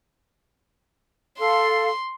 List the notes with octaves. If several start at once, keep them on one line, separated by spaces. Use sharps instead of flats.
A4 F5 C6